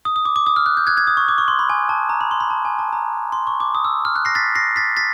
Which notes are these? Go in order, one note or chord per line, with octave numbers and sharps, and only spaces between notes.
D#6
D#6
D6
D6
D#6
F6
F#6
G6
F#6 G#6
F#6 G#6
D#6
C#6
D6
C#6
C6
B5
G#5
A5
A#5
B5
C6
B5
A5
G#5
A5
A#5
C6
C#6
D6
D#6
E6
F6
F#6
A#6 C7
A6 B6
A#6 C7
A6 B6
A6 B6